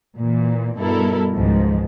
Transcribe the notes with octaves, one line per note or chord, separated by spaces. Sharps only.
A#2 E3
G2 B2 E4 A4 A#4
C#2 G#2 D#3 F3